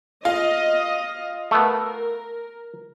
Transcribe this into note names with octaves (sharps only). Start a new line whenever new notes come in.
F4 D#5
A3 B3 A#4